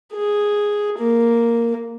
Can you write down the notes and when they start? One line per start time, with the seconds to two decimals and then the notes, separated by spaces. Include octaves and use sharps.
0.13 G#4
0.98 A#3